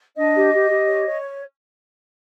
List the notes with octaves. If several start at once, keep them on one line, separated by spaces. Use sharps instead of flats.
D4 D#5
G4
G4
G4
C#5
C#5